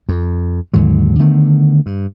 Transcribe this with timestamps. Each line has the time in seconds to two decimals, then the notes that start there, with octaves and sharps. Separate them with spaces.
0.09 F2
0.74 D#2 G#2 D3 F#3
1.19 D3 D#3 A3 B3
1.86 G2